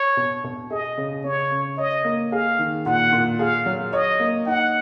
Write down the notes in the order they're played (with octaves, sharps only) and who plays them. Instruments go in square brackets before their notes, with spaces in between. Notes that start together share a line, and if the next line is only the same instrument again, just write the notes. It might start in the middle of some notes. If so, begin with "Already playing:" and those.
Already playing: [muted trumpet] C#5
[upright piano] B2
B2
[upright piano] G#4 [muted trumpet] D#5
[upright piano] C#3
[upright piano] C#3 [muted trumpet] C#5
[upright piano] C#3
[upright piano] C#5 [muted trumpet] D#5
[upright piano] A#3
[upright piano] G#4 [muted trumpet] F5
[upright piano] D#3
[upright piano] A#2 [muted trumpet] F#5
[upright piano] A#2
[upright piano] G#4 [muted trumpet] F5
[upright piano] F#3
[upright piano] C#5 [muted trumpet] D#5
[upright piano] A#3
[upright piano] D#4 [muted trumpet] F#5